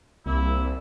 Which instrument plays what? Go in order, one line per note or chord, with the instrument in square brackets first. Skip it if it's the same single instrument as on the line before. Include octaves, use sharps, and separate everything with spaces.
[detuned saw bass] C2 [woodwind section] A#3 E4